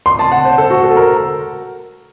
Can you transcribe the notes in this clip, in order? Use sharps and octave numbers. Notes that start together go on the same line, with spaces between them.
C6
A5
F#5
C5
A4
F#4
A4
A#4